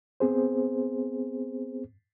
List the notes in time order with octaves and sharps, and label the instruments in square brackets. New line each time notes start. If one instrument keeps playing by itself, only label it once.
[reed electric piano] B3 C4 G#4 C5